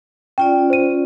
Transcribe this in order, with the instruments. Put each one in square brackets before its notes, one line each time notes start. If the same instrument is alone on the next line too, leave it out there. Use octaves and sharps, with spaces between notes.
[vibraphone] C#4 F4 D5 [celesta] G5
[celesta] C5 D#7